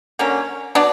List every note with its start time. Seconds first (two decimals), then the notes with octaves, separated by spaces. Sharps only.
0.19 D3 F#3 A#3 C#4
0.75 F#3 B3 D4 D5